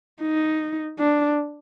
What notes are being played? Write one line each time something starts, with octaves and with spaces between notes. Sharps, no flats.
D#4
D4